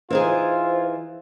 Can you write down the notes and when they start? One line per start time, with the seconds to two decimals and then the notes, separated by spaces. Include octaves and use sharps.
0.10 E3 D#4 F4 G#4 C5